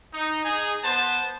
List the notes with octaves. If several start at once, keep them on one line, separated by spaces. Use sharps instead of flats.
D#4
D#4 G#4
B3 C5 A5